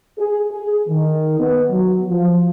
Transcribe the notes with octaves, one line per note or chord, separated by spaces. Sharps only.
G#4
G#4
D#3
B3
F#3
F3